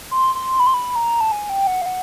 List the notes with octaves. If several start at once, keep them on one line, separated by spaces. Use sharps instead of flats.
C6
C6
B5
C6
B5
A#5
A5
G#5
G5
F#5
F5
F#5